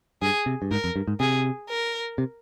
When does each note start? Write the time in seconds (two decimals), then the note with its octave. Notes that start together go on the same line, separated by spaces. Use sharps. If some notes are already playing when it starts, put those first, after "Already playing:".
0.22 G2 G#4
0.46 C3
0.62 G2
0.71 G#2 A#4
0.84 F2
0.96 G2
1.08 G#2
1.20 C3 G#4
1.69 A#4
2.18 C3